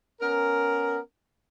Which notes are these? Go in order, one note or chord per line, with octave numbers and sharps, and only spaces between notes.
B3 C#4 A#4